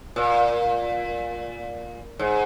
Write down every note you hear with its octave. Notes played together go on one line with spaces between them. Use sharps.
A#2
G#2